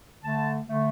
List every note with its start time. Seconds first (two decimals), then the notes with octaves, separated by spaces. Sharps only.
0.23 D3 A3 A5
0.68 D3 A3